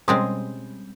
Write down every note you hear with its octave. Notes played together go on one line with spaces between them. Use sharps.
B2 G3 G#3 C4 C#4 C6 D#6